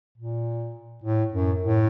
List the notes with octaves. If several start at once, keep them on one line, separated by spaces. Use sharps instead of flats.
A#2
A2
F#2
A2